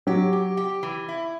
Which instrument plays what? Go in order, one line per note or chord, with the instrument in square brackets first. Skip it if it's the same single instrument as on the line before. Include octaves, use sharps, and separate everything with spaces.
[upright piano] F#3 [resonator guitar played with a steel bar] G4
[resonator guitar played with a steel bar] G4
G4
E3
E4